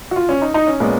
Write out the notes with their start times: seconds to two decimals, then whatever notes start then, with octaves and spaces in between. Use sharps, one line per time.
0.11 F#4
0.16 F4
0.29 C#4
0.42 D#4
0.54 D#4
0.67 C#4
0.80 A#2 G#3 B3